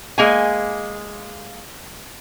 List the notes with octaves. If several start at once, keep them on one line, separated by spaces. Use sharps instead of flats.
G#3 A#3 G#5